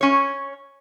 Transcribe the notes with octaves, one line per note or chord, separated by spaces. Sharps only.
C#4 C#5